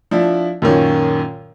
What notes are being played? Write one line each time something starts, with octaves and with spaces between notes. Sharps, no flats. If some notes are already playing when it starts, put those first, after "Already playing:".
F3 D4 E4
F#2 A#2 D#3 C#4